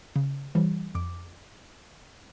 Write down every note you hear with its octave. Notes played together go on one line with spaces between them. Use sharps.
C#3
E3 G3
F2 D6